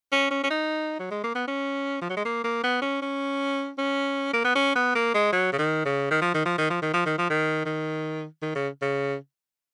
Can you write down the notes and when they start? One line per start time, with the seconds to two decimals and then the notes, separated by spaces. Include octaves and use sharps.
0.12 C#4
0.31 C#4
0.43 C#4
0.51 D#4
0.99 F#3
1.11 G#3
1.24 A#3
1.35 B3
1.48 C#4
2.01 F3
2.10 F#3
2.16 G#3
2.25 A#3
2.44 A#3
2.63 B3
2.82 C#4
3.02 C#4
3.78 C#4
4.33 A#3
4.44 B3
4.55 C#4
4.75 B3
4.95 A#3
5.14 G#3
5.33 F#3
5.53 C#3
5.58 D#3
5.85 C#3
6.11 D#3
6.22 F3
6.34 D#3
6.46 F3
6.58 D#3
6.70 F3
6.82 D#3
6.93 F3
7.06 D#3
7.18 F3
7.30 D#3
7.65 D#3
8.42 D#3
8.55 C#3
8.82 C#3